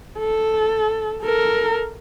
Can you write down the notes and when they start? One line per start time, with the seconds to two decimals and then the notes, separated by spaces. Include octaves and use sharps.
0.19 A4
1.23 A4 A#4